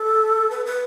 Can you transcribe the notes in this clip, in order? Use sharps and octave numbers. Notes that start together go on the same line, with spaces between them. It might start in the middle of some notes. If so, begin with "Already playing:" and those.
Already playing: A4
B4
B4